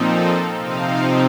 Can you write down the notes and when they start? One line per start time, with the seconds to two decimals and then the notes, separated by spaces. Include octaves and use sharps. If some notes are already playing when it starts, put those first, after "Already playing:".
Already playing: A#2 F3 C4 D#4 A4
0.55 C3 F3 C4 D#4 F5